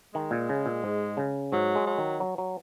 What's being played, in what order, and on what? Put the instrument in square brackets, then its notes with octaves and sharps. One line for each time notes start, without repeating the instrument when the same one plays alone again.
[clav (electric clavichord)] D#3 [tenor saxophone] G#3
[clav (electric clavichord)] A#2
C#3
A#2
G#2
C#3
[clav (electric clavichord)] G#2 [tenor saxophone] F#3
[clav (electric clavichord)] G#3
[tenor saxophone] F#3
[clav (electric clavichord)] D#3
F#3
F#3